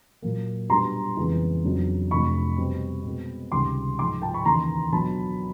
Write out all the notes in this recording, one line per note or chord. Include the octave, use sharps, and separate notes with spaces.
A#2 F#3 A#3
B2 G3 B3 D4 A#5 C6
F2 C#3 E3 G#3 B3
F2 C#3 F#3 B3 D4
F2 C3 F3 A3 D4 B5 C#6
B2 G3 C4
B2 G#3 C4
C#2 C3 D#3 G3 C6 D6
G#2 F3 G#3 C6 D6
G5 A5
B5 C#6
D#2 C#3 E3 A#5 C6
B2 F#3 B3 D4 A5 B5